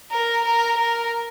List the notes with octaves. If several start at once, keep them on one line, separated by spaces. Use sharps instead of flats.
A#4
A#4
A#4